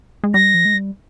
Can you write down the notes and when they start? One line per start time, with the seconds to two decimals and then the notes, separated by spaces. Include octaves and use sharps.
0.24 G#3
0.34 G3 A#6
0.54 F3
0.65 G#3
0.74 G3